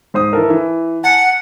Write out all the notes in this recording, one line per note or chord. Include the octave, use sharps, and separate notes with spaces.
G#2 C5 D#6
E3 A4 A#4
E3
F#5 G#5 A5